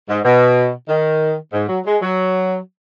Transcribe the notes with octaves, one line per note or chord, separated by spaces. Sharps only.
G#2
B2
D#3
G#2
F#3
G#3
F#3